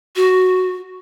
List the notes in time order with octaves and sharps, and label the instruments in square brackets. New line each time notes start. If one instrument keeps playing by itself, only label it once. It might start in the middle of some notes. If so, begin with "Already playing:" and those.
[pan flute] F#4